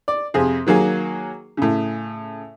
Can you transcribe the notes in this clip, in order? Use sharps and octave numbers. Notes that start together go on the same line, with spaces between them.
D5
F2 C3 G#4
D#3 F#3 A#3 G#4
A2 C#3